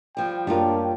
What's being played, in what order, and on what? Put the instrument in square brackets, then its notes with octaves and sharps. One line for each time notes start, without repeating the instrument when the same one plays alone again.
[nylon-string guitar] F3 G3 [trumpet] G5
[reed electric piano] F#2 A#3 A#4 [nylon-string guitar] G3 C#4 F4 [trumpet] D4 [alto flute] G5